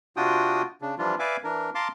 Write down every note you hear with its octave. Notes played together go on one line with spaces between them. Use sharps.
C3 D4 F4 F#4 G5 D#6
C#3 D4
E3 F3 G3 D4 F4
B4 D5 E5 F5 G#5 D6
E3 D4 A#4
F5 A5 A#5 C6 D6